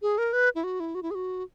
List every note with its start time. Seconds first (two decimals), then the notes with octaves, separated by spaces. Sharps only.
0.02 G#4
0.18 A#4
0.33 B4
0.55 E4
0.64 F#4
0.80 E4
0.95 F#4
1.03 E4
1.11 G#4
1.15 F#4